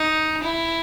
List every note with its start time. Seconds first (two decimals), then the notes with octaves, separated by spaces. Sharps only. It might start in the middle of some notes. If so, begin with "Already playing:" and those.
Already playing: D#4
0.42 E4